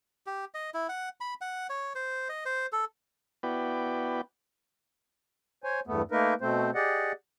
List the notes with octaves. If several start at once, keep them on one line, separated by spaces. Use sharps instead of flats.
G4
D#5
E4
F#5
B5
F#5
C#5
C5
D#5
C5
A4
B3 E4 F#4 B4 D5 G5
C5 C#5 G#5
E2 G2 A3 B3
A3 A#3 D#4 A#4 B4
B2 A3 C4 C5
G4 G#4 D5 D#5 F#5